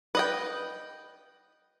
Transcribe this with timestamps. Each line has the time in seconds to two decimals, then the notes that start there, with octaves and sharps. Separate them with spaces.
0.15 B4 D#5 G5